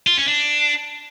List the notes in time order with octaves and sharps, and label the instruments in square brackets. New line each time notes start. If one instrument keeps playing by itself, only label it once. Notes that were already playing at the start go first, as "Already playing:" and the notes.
[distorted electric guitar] F4
C#4
D4